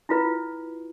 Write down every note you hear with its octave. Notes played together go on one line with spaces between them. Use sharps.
E4 F4 B4